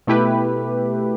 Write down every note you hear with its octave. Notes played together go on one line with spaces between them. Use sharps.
B2 A3 E4 G4 B4